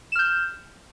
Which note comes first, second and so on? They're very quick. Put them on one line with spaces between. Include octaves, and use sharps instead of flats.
E7 F6 G6